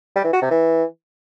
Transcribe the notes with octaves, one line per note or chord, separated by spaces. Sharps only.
G3
E3
F#4
C3
E3